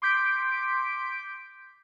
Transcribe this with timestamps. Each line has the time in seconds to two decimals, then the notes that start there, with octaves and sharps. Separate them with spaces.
0.02 C6 D6 G6 B6 D7